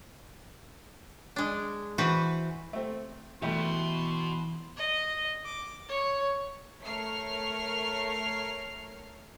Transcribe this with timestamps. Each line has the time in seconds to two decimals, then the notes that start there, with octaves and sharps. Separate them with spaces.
1.36 G#3 D4
1.98 E3 F#4 B4 C5
2.73 A3 C4
3.42 B2 E3 G3 A3 G4 C6
4.77 D#5
5.45 D6
5.88 C#5
6.80 A3 A#4 C#5 F6 C7